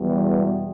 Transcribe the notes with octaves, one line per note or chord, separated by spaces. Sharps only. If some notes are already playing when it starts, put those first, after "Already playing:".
Already playing: E2 B2 G3
G#3 B3